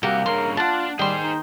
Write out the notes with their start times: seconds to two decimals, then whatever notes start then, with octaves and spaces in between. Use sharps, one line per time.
0.03 C2 A#3 F#4 G4
0.26 G2 C#3 A#4 C6
0.57 D4 F4 F#5 A5
0.99 D#3 G3 G#4 C5 G5 C6
1.22 D#4